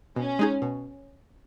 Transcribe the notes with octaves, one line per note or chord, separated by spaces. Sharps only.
B2 C#4
G#3 D#4 G#4
B2